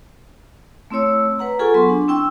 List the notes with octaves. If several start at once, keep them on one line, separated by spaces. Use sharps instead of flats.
A3 C4 E4 C#5 E6
B4 F#5 A#5
F4 G#4 A4 F#5 G#5 C#6
F#3 B3 C6
D4
C4 E4 G5 C#6 E6